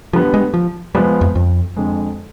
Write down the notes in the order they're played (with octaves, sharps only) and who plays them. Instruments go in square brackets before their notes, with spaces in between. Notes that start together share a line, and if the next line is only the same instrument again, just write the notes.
[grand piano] D3 G3 B3 [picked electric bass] F3
[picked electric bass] G#3
F3
[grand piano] F3 G#3 B3 [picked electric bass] G3
[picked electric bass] F2
F2
[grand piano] F2 D3 G#3